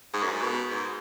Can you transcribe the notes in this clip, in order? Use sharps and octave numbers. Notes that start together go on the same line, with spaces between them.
G#2
F#2
G#2
B2
G#2